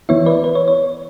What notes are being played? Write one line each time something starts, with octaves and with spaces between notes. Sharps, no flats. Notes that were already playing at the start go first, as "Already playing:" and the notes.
E3 B3 E4 C#5 E5
B4 D5
B4
C#5
C#5